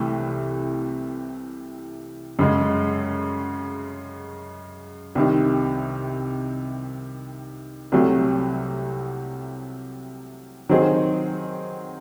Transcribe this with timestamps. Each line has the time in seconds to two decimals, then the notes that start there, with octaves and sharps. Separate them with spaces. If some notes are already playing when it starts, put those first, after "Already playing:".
Already playing: C2 C3 E3 A3
2.39 F#2 C#3 G#3
5.15 C2 C3 D#3
7.92 C2 C3 F#3 A3
10.69 D#3 F#3 C4 D#4 G#4